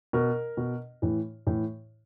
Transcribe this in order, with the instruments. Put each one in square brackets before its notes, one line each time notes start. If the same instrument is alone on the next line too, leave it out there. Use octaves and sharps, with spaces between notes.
[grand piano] B2 A#4
B2
A2 E3
A2 E3